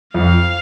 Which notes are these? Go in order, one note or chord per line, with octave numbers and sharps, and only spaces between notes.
F2 F5